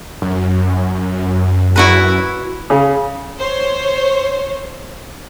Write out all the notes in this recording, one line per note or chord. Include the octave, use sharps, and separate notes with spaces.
F#2
E4 F#4 B4
C#3
C5 C#5